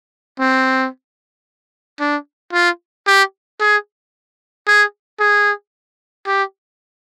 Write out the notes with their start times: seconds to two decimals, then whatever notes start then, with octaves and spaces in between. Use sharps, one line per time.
0.40 C4
2.00 D4
2.53 F4
3.07 G4
3.60 G#4
4.67 G#4
5.20 G#4
6.26 G4